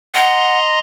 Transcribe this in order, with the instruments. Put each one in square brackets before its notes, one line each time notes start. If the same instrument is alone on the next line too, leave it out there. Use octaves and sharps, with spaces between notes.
[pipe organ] D#5 A#5 C6 [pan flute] F#5